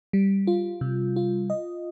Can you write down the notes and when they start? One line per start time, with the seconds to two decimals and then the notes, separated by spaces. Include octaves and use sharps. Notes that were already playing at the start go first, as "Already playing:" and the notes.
0.13 G3
0.47 F4
0.81 C3
1.16 F4
1.50 D#5